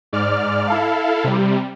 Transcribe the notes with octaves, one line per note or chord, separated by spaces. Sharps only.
G#2 D5 F6
E4 A4 F5
C3 G3